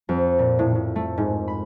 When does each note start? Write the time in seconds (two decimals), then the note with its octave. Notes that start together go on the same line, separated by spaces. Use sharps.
0.09 F2
0.39 A#2
0.59 A2
0.75 A2
0.96 A3
1.18 G#2
1.48 B5